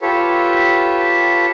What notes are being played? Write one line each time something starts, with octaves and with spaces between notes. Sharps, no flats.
F4 G4 A4 B4 C#5